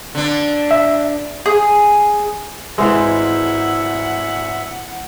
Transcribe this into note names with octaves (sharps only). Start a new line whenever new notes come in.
D3 D4
E5
G#4
G#1 E3 G#3 G#4 C5 E5 F#5